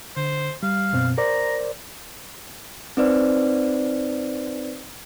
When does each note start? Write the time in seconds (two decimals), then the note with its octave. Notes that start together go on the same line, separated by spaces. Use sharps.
0.17 D3 C5
0.63 G3 F5
0.93 F#2 B2 C4
1.18 A#4 C5 D5 A#5
2.97 C4 D#4 B4 C5 D5